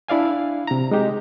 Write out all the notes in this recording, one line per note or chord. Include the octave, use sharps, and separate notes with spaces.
D4 E4 D5 F5 G#5
C3 A#5
G#3 D#4 G4